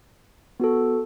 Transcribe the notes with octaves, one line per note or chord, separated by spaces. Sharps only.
B3 F#4 A4